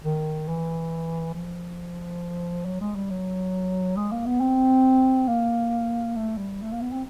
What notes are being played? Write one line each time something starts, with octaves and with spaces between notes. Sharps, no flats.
D#3
E3
F3
F#3
G#3
G3
F#3
G#3
A#3
B3
C4
A#3
A3
G3
A3
A#3
B3
C4